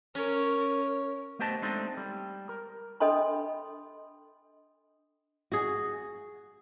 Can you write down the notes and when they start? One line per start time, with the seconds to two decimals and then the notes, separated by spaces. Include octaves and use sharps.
0.15 C#4 A#4
1.39 A3 B3 G4 C5 D#5 A5
1.62 G#3 A3 C4 D4 D#4 A4
1.97 G3
2.49 A#4
3.00 D4 A4 D#5 G5 B5 C6
5.52 F#4 G#4